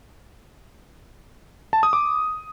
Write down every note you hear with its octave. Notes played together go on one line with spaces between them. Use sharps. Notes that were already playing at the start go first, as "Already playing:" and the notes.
A5
D#6
D6